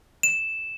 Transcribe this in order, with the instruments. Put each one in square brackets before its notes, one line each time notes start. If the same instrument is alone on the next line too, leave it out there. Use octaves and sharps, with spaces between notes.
[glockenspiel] E7